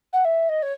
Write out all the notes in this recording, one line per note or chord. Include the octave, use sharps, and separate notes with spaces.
F#5
E5
D#5
C#5